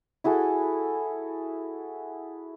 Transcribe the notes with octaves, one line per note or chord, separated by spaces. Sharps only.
E4 F#4 G#4 A4